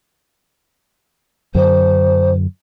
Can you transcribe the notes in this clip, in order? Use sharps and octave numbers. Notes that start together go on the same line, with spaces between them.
F#2 D3 F#3 C5